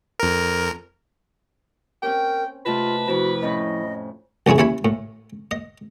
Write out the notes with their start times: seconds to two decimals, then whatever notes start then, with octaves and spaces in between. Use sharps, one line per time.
0.19 F2 A#4
2.03 C4 C#4 A#4 G5
2.66 C3 A3 F4 B4 D#5 A5
3.08 F2 C3 F3 C4 E4 F#4
3.42 A2 C4 C#4 D#5
4.46 C2 F2 C#4 E4 G#4
4.58 D#2 C#4 E4 G#5 B5
4.85 A2
5.51 D#5